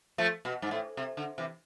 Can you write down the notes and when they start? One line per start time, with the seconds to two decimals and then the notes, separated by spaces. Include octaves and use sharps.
0.18 F3 A3
0.45 B2
0.62 G#2
0.71 A2
0.97 C3
1.17 D3
1.38 C3 E3